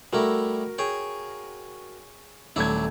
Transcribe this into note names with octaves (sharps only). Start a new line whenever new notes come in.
G3 A3 E4 F#4 A#4
G#4 C#5 G5
D#1 F#3 A3 D4 E4 G#6